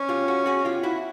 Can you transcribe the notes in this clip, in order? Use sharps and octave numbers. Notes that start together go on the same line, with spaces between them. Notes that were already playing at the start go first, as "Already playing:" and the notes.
Already playing: C#4
F4 G4
F#4 G#4
F#4 G#4
F4 G4
E4 F#4